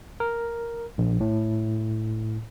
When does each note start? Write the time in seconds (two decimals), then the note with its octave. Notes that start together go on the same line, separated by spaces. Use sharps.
0.20 A#4
0.98 A#1
1.20 A2